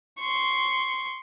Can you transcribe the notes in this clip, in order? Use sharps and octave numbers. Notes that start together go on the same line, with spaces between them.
C6 C#6